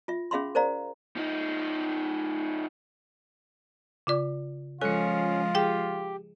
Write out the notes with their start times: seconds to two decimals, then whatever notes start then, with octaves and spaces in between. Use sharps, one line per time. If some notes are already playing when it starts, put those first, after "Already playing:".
0.08 F4 E5
0.31 C#4 G#4 E5 F5 B5 C6
0.55 A#4 C5 D5 F5 A#5
1.17 F3 D#4
4.07 C#3 F4 D5
4.81 F3 G#3 C#4 F4 A4 C#7
5.55 G4 G#4 G5